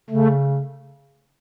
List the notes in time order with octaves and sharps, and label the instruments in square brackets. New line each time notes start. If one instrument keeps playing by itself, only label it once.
[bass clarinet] C#3 [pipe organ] A3